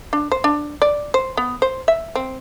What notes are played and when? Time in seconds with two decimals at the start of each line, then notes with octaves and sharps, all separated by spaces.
0.13 D4
0.32 C5
0.44 D4
0.82 D5
1.14 C5
1.37 B3
1.62 C5
1.88 E5
2.15 C4